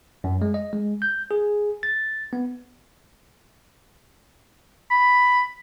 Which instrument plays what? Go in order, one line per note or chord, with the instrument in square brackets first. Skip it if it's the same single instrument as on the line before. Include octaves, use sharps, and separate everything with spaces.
[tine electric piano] F#2
G#3
D#5
G#3
G6
G#4
A6
B3
[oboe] B5